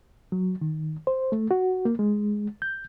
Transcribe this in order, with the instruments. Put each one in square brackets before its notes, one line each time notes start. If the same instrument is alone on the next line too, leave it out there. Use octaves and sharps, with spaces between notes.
[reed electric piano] F#3
D#3
C5
A3
F#4
A#3
G#3
G6